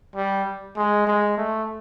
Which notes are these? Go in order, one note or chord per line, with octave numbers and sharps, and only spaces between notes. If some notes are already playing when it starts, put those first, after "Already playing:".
G3
G#3
G#3
A3